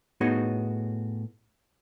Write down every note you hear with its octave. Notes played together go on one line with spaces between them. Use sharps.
A2 B3 D#4 F#4 G#4 C#5